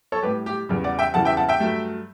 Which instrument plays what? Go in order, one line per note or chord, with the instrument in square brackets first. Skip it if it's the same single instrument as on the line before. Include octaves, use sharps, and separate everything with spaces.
[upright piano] A4 C#5
A2 G3 G4 B4
G4
E2 C#3 G3
D5 F#5
E5 G5
E2 C#3 E3 G3 F#5 A5
E5 G5
F#5 A5
E5 G5
G2 F#3 A3